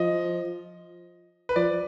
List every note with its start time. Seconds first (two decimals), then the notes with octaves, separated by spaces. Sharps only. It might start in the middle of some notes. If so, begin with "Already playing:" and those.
Already playing: F3 D#5
1.49 B4
1.56 F3 D5